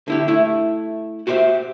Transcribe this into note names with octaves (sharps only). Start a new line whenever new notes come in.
D3 E4 G4
A3 E4
F#4 G4 C5 C#5 E5